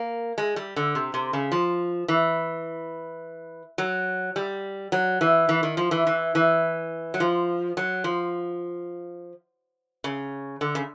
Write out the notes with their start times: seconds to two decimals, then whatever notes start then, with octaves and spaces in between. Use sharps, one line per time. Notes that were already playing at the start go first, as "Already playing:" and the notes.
Already playing: A#3
0.38 G#3
0.56 G3
0.76 D3
0.95 C3
1.14 C3
1.33 C#3
1.52 F3
2.08 E3
3.78 F#3
4.36 G3
4.92 F#3
5.21 E3
5.49 E3
5.63 D#3
5.77 F3
5.91 E3
6.07 E3
6.35 E3
7.14 F#3
7.20 F3
7.77 F#3
8.04 F3
10.04 C#3
10.61 D3
10.75 C#3